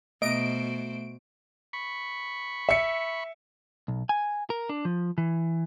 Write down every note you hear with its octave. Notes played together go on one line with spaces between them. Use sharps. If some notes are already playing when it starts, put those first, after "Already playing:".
B2 A3 F#4 C5 D#5 D7
B5 C#6
E5 C#7
B1
G#5
A#4
D4
F3
E3